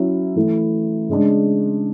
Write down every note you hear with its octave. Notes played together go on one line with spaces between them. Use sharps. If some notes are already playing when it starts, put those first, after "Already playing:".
Already playing: F#3 C#4 E4
E3 A3 E4
C#3 G#3 D4